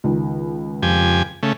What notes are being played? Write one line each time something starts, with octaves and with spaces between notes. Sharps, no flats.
C#2 D#3
F2 G4 G#5
C#3 A3